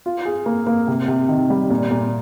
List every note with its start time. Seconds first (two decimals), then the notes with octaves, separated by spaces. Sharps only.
0.06 F4
0.25 G#4
0.46 A#3
0.67 A#3
0.88 C3
1.08 C3
1.29 D#3
1.50 G3
1.70 A#2
1.91 A#2